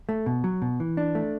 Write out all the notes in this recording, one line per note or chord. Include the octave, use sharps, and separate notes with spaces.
A3
B2
F#3
B2
E3
D4
A3